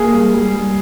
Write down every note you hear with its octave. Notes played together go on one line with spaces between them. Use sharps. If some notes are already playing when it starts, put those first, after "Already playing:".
Already playing: A#3 G#4
G3
G3
G3